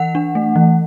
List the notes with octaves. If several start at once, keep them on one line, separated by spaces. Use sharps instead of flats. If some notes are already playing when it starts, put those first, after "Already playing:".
Already playing: E3 F#5
D4
A3
E3